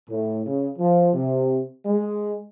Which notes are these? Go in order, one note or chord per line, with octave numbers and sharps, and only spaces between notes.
A2
C#3
F3
C3
G#3